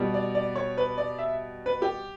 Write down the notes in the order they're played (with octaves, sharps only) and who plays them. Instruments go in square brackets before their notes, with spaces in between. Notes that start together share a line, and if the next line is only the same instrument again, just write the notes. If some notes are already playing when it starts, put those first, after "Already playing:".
Already playing: [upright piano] B2 G3
D5
D5
C#5
B4
D5
E5
B4
G4